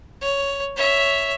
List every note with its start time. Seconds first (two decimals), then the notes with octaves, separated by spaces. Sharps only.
0.21 C#5
0.76 C#5 E5